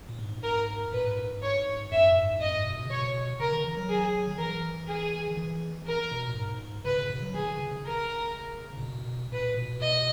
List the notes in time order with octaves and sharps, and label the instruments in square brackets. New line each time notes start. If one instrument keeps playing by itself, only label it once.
[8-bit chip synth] A#2
G#2
[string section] A#4
[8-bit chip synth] A#2 [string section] B4
[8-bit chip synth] G#2
G#2
[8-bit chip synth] G#2 [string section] C#5
[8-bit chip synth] F#2 [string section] E5
[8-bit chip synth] G#2
[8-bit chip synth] F#2 [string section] D#5
[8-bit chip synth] G#2
B2
B2
C#3
[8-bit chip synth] B2 [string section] C#5
[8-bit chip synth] C#3 [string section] A#4
[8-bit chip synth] D#3
E3
F#3
[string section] G#4
[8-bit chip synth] D#3
[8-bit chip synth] E3 [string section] A#4
[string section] G#4
[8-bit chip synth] D#3
E3
[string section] A#4
[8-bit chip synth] B2
A#2
G#2
[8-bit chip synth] C#3 [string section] B4
[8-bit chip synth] C#3
B2
F#3
[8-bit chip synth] D#3 [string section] G#4
[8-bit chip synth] D#3
C#3
C#3
[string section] A#4
[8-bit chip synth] A#2
B2
[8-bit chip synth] A#2 [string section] B4
[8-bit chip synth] B2
[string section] D#5